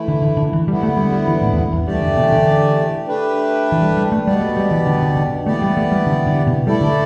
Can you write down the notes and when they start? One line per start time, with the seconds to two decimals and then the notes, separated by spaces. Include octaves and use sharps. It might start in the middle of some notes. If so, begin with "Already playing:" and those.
Already playing: E3 A3 E4
0.08 D3
0.22 D3
0.37 D3
0.53 E3
0.68 D3 G3 B3 E4
0.83 A3
0.97 G3
1.12 G3
1.28 E3
1.42 A2
1.53 E2
1.57 G2
1.73 E2
1.87 G2 E3 A3 G4 D5
2.02 D3
2.17 B2
2.32 D3
3.07 A3 D4 G4 B4
3.72 E3
3.82 G3
3.97 G3
4.12 A3
4.27 B2 G3 B3 G4 D5
4.41 A3
4.57 G3
4.71 E3
4.87 D3
5.02 D3
5.17 D3
5.46 E3 A3 B3 G4 D5
5.62 G3
5.77 A3
5.92 G3
6.07 D3
6.27 D3
6.47 B2
6.67 G3 A3 E4 A4 D5
6.81 D3